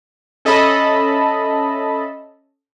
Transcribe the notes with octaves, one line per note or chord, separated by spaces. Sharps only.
C#4 A4 D#5 E5 A5 B5